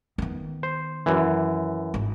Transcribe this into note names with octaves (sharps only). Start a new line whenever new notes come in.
D#3 B3
C5
F#2 E3
G#1